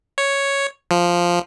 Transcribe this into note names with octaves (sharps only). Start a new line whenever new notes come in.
C#5
F3